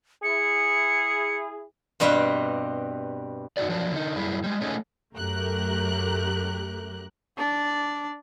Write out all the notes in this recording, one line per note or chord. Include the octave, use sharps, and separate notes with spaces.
E4 G#4 C#7
G2 B2 G3 C4 E5 F5
D#4 F#4 G4 B4 D5
F3 F#3 D4
D3 D#4
F#2 G3 E4 G#4
G3 G#3
A3 C#4 D#4 G#4
F#2 F#3 A3 G4 A#4 F#6
D4 D5